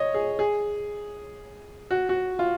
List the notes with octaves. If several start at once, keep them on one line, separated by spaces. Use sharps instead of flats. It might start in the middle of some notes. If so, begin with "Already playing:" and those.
Already playing: C#5 D#5
G#4
G#4
F#4
F#4
F4